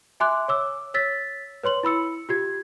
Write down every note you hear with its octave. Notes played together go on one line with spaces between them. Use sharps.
E5 G#5 C6 D6 F#6
C#5 D6 E6
C#5 E6 A6 B6
B4 C#5 C6 F#7
E4 B5 E6 C#7
F4 G4 G#6